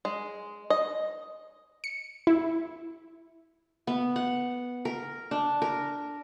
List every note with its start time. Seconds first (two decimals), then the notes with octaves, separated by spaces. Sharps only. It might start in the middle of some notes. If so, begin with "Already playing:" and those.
0.05 G#3
0.70 D#5
1.84 C#7
2.27 E4
3.87 B3
4.16 F#5
4.85 A#4
5.31 D4
5.62 A#4